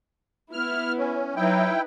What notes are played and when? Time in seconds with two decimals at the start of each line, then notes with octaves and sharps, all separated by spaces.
0.53 B3 E4 F6
0.98 C#4
1.36 F#3 D#4 E4 B4 G5